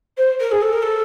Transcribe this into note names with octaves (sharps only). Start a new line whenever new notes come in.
C5
A#4
G#4
A4
A#4
A4